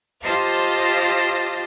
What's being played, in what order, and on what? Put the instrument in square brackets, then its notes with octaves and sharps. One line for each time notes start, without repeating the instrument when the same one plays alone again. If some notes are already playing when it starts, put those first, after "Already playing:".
[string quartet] F4 G4 C5 D#5 F5 A5